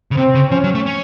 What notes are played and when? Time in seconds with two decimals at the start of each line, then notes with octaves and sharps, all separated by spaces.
0.11 C#3
0.17 C3 C4
0.35 C#3
0.51 F3 C#4
0.64 F#3
0.75 A3
0.86 C#4